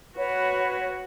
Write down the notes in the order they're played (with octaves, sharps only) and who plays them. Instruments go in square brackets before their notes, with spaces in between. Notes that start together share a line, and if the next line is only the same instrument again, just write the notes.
[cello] F#4 [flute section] B4 C#5